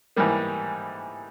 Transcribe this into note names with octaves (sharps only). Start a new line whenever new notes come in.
G#2 E3 G3 A#3